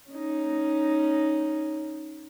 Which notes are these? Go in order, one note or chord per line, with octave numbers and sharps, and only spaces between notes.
C#4 D#4